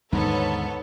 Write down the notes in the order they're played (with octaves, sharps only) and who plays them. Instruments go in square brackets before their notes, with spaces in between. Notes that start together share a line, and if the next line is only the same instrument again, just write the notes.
[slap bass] D#2 D3 D#3 [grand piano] G#2 [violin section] B3 A4 C#5